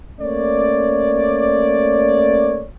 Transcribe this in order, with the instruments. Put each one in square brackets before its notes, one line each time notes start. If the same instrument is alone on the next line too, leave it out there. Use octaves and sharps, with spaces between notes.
[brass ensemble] A3 A#3 C#4 C#5 D5